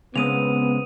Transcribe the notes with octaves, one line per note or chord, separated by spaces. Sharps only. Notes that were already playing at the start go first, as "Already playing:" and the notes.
C#3 G#3 B3 C4 D#6 D#7 F7